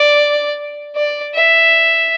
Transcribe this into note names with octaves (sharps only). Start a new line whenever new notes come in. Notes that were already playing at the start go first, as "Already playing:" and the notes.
Already playing: D5
D5
E5